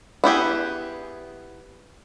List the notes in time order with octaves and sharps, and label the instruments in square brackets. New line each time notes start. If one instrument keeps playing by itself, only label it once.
[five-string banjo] B3 E4 G4 G#4